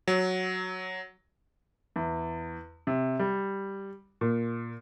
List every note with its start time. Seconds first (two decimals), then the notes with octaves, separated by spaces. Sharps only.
0.08 F#3
1.96 E2
2.87 C3
3.19 G3
4.21 A#2